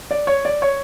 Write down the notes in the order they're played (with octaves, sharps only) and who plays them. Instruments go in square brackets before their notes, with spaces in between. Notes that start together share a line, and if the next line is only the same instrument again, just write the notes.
[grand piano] D5
C#5
D5
C#5